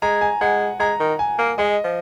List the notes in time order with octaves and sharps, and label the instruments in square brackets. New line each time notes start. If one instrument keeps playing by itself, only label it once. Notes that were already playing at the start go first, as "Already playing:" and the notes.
[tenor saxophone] G#3 [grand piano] A#5
[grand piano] G#5
[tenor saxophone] G#3 [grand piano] F#5
[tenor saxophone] G#3 [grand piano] A#5
[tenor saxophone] D#3
[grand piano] G#5
[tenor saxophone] A#3
[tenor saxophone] G#3 [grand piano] D#5
[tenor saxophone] F3